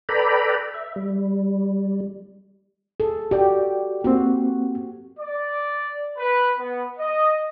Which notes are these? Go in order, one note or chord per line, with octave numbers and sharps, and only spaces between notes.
A4 B4 D5 G5 A#5 B5
E5
G3
G#4 A4
F#4 G4 D5 G5
A#3 C4 F#4
D5
B4
B3
D#5